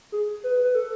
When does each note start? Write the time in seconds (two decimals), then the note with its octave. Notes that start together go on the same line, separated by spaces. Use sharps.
0.12 G#4
0.44 B4
0.64 B4
0.75 A4